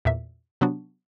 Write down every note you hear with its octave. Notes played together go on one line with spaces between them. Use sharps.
E2 A#2 E5
C3 F#3 B3 D4 F#4